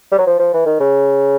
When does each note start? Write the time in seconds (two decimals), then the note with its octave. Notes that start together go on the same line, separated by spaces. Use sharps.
0.12 G3
0.18 F#3
0.26 F3
0.39 F3
0.53 E3
0.66 D#3
0.80 C#3